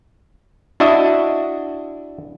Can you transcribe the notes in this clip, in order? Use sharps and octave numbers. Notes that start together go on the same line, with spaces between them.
D4 E4 F#4 D#5 E5